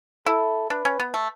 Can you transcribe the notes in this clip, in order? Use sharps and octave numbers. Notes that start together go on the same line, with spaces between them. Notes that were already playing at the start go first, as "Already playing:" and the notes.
E4 A4
D4 B4
C#4
B3
A3